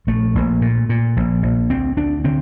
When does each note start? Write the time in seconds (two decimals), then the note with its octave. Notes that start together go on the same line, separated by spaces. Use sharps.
0.07 A#1 A3
0.35 A#1
0.62 A#2
0.89 A#2
1.17 A#1
1.43 A#1
1.70 D2 C4
1.97 D2 D4
2.24 D3 C4